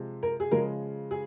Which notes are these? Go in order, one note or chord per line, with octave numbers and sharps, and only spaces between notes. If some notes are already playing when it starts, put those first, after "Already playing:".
Already playing: C3 F3 G#3
A#4
G#4
C#3 F3 G#3 A#4
G#4